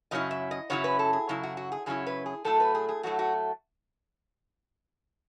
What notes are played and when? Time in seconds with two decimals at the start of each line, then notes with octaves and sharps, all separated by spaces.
0.11 F#2 C#3 F#3 C#4 E4 D#5
0.31 E5
0.51 D#5
0.70 F#2 C#3 F#3 C#4 E4 C#5
0.84 B4
0.99 A4
1.13 G#4
1.29 F#2 C#3 F#3 E4
1.43 F#4
1.57 F#4
1.72 G#4
1.86 F#2 C#3 F#3 C#4 E4 G#4
2.07 B4
2.26 G#4
2.45 A2 F#3 A3 A4
2.60 B4
2.75 G#4
2.89 G#4
3.03 A2 F#3 A3 F#4
3.19 F#4